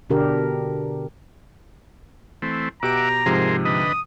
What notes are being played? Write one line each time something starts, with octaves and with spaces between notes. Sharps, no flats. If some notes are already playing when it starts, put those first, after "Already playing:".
B2 D3 D4 G4 A#4
E3 A3 C4
B2 G4 E5 F#5 A#5 D6 D7
G#2 C3 F3 G#4 A#4 C5
D3 B4 D#5 D#6